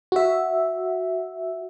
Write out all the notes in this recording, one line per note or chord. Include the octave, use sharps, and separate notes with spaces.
F#4 E5